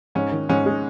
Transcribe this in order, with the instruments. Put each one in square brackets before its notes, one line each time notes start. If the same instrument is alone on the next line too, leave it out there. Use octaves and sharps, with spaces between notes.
[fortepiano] G#2 [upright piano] C#4
[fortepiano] D#3
[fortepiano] G#2 [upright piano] C#4
[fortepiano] G#3